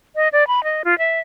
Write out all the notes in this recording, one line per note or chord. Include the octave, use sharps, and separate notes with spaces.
D#5
D5
B5
D#5
F4
E5